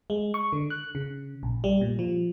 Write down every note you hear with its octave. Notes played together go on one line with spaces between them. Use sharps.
G#3
C#6
D3
F#6
C#3
A#1
G3
A#2
F3